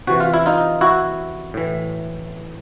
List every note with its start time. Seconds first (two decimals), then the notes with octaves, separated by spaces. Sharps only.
0.07 C3 E3 F#4
0.20 F4
0.34 E4
0.46 D#4 F4
0.81 E4 F#4
1.54 A2 E3